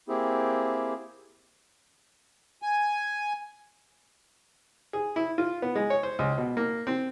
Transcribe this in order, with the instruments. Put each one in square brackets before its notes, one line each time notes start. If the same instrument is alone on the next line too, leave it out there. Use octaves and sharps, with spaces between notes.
[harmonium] A#3 C4 E4 G4 G#4
[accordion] G#5
[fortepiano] G#4
E4
F4
B3
G#3
C#5
C5
C#2
B2
A#3
C4